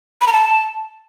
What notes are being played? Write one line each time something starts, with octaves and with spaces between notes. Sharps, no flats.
B5
A#5
A5